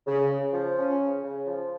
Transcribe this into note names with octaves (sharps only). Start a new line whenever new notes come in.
C#3
C#3
F3
C#4
C#3
C#3
F3